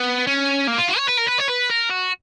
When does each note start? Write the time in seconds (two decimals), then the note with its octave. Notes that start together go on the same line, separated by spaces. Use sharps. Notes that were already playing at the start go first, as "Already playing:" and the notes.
Already playing: B3
0.27 C#4
0.68 A#3
0.79 F4
0.89 F#4
0.98 C#5
1.09 B4
1.18 A#4
1.29 B4
1.40 C#5
1.49 B4
1.71 A#4
1.90 F#4